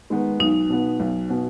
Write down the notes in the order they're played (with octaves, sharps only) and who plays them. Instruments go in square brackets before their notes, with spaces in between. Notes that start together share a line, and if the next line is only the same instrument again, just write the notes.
[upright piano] D#3 G#3 B3
[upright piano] B1 [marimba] D#4
[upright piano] B2 B3
B1
B2 B3